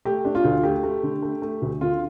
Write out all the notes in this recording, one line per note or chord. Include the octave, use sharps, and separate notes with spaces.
A3 G4
D4
F4
D2
A3 G4
A3
D3
A3
A3
D2
D3 F4